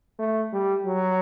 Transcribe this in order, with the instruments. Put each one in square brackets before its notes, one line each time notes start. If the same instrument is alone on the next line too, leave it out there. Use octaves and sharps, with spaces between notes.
[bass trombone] A3
G3
F#3